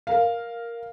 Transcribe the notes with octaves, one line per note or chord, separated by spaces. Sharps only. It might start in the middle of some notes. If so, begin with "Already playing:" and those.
A#4 F5